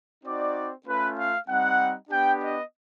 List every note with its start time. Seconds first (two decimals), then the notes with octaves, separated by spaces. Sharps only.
0.23 C4 D#4 F#4 D5
0.85 A3 C#4 F4 B4
1.16 F5
1.47 G3 C4 D#4 F#5
2.10 B3 D4 G4 G5
2.41 D#5